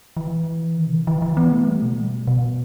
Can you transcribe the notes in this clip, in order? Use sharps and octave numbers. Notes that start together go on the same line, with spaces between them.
E3
D#3
C3
D#3
E3
E3
B3
A3
G3
B2
B2